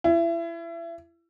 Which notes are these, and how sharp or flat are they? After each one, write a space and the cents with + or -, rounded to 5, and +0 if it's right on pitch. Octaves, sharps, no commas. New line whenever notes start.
E4 +30